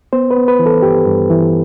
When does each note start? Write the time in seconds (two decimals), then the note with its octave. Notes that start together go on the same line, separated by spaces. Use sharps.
0.13 B3 C5
0.31 B4
0.37 B3
0.48 B4
0.59 E3
0.66 A4
0.82 G2 G4
1.06 G2
1.30 E3